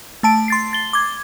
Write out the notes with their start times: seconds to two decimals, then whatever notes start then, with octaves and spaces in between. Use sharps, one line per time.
0.23 A3 A5 D7
0.48 C6 A6 C7
0.73 A6 G7
0.93 D6 G#6